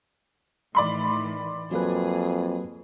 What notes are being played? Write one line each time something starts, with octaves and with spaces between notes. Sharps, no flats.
A2 D#3 E3 D5 B5 C6
F2 F#3 A#3 G#4 B4